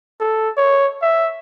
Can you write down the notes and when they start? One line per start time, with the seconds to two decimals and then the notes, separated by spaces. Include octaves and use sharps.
0.20 A4
0.57 C#5
1.02 E5